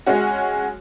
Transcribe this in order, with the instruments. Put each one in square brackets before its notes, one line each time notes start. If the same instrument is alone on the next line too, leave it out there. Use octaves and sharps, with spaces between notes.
[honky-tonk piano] G#3 C#4 F#4